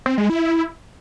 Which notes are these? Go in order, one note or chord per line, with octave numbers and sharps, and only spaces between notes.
C4
G#3
E4